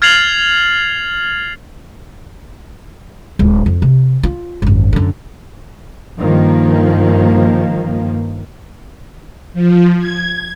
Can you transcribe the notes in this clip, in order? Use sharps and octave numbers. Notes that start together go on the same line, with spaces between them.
F6 G#6 A6 C7 F7 F#7
D1 G#3
F2
C3
F4
G#1 F#2
F#2 D3
G2 D#3 F3 A#3
F3
G#6